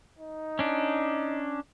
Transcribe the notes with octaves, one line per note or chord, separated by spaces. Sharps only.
D#4
C#4 D4